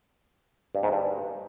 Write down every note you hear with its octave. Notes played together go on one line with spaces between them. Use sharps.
G2
G#2
G2